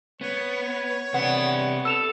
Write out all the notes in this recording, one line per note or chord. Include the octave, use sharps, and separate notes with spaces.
B3 C#5
C3 B3 D4 F#5
A4 E6 E7 F7